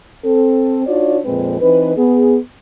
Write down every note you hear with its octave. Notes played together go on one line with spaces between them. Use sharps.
C4 A4
D4 D#4 F4 F#4 C#5 D5
F2 A#2 G#3 C4 B4
E3 C4 D#4 B4
B3 G#4